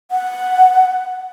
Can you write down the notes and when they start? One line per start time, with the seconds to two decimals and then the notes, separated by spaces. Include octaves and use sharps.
0.11 F#5